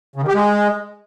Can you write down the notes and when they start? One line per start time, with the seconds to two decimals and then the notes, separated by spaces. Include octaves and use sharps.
0.16 C#3
0.22 D#3
0.28 G4
0.34 G#3